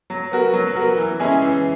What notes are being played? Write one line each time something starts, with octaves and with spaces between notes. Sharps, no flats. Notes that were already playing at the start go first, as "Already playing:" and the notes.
F#3
B3 F#4 A#4
F#3
B3 F#4 A#4
E3
G#3 C#4 E4 G#4
E3